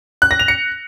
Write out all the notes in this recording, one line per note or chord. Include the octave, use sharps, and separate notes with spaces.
F#6
A#6
F7
C#7